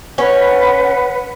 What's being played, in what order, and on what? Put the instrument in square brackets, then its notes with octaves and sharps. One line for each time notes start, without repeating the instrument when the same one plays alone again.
[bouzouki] C#4 C#5 [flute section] B4 F#5